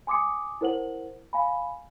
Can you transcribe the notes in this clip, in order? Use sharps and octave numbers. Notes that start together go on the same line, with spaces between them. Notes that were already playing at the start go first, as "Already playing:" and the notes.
G#5 C6 D6 D#6 C#7
E4 A#4 C5 F#5 F#7
F5 G#5 B5